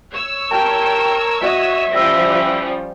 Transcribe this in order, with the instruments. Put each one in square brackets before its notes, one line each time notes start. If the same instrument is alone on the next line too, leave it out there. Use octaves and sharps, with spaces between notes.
[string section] C#5 E6
[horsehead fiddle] G4 G5 [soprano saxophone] A#4 [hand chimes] A5 F6
[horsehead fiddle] F#4 D#5 [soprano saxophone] E5
[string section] F3 G3 [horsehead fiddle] C#4 [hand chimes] E6 A#6